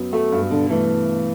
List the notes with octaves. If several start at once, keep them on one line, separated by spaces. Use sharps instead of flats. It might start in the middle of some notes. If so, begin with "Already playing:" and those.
Already playing: F#2 F#3 B3
A3 F#4
G2
B2 D3
E3 A3